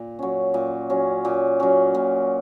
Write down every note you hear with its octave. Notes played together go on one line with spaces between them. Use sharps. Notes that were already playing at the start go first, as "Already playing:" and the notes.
Already playing: A#2
F#3 C#4
A#2
F#3 C#4
A#2
F#3 C#4
A#2